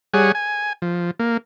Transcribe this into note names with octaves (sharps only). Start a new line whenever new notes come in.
G3 G#4 C#5 F#5 G#5
G#5
F3
A#3